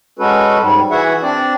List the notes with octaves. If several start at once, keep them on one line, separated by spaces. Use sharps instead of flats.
G#3 C#4 F#4 A4 B4
G#2 G3
E3 F#4 G#4 E5 F#5
C4 D4 D5